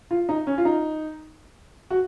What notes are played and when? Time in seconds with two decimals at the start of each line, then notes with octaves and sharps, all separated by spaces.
0.11 F4
0.29 D#4
0.47 C#4
0.58 F4
0.65 D#4
1.91 F#4